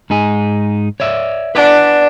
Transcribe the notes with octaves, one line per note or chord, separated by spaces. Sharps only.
G#2 D#4 G#4
C#5 D5 E5
D4 B4 D5 F#5